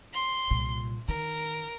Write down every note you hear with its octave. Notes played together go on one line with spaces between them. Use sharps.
C6
C2 A#2
D#3 A#4